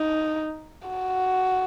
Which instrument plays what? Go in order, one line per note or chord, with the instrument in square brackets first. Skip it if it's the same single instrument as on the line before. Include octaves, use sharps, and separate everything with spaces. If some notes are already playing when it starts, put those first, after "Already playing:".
Already playing: [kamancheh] D#4
F#4